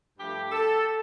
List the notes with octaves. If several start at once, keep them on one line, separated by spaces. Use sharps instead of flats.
G2 F3 A3 G4
A4